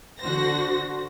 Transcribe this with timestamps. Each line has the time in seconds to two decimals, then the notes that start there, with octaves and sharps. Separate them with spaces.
0.20 D3 F#4 C5 A#6